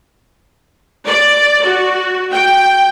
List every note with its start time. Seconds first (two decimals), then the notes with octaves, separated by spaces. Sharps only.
1.07 D5
1.66 F#4
2.33 G5